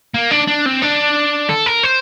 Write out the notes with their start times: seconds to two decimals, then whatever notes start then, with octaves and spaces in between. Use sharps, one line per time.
0.14 A#3
0.31 D4
0.47 D4
0.65 C4
0.82 D4
1.49 A4
1.66 A#4
1.83 C5